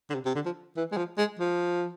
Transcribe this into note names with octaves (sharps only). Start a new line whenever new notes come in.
D3
C3
C3
D3
F3
E3
G#3
F3
G#3
F3